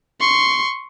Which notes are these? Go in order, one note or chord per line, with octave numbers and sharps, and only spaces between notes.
C6 C#6